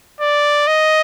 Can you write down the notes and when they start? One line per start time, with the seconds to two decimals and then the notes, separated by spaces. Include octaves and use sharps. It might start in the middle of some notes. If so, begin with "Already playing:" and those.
0.21 D5
0.67 D#5